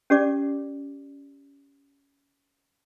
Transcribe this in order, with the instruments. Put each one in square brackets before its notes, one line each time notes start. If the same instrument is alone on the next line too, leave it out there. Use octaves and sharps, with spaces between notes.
[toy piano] C#4 G4 D5 D6